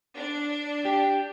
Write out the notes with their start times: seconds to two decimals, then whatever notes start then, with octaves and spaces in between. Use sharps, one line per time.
0.16 D4
0.85 G4